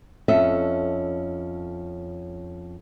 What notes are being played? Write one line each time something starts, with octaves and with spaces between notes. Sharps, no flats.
F2 C#4 A4 D#5 E5